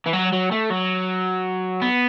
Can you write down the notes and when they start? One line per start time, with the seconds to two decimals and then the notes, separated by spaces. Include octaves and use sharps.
0.06 E3
0.13 F#3
0.32 F#3
0.51 A3
0.70 F#3
1.82 B3